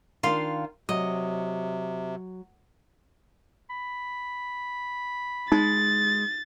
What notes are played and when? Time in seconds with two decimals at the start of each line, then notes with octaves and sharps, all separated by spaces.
0.23 D#3 D4 F4 F5 C6
0.89 C3 F#3 D#5
3.70 B5
5.52 G#3 D#4 A6